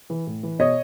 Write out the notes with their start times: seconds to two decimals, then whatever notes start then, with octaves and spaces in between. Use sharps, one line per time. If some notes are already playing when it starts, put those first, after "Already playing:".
0.10 E3
0.27 A2
0.43 E3
0.59 B2 C#5 D#5